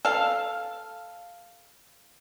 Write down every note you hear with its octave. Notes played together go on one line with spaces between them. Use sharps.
A4 F5